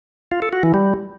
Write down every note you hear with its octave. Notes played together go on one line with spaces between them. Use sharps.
F4
A4
F#4
E3
G3